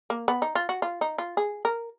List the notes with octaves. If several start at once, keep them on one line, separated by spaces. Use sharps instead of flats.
A#3
B3
D#4
F4
F#4
F4
D#4
F4
G#4
A#4